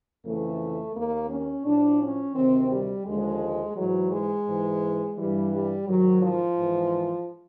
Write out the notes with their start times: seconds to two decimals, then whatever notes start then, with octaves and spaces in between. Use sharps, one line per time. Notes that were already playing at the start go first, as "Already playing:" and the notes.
0.25 F2 C#3 E3 A3
0.95 D#2 D#3 A#3
1.30 C#4
1.66 A2 F3 D4
2.01 C#4
2.35 D2 C3 D#3 C4
2.71 G3
3.06 D#2 D3 F3 G#3
3.76 G#2 E3 F#3
4.11 G#3
4.47 G#2 E3
5.17 G2 E3 G3
5.53 G3
5.88 G#2 D#3 F#3
6.22 F3
6.57 G#2 E3